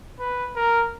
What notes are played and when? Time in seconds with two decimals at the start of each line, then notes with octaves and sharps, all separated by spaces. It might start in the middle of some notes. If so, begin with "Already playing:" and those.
0.19 B4
0.56 A#4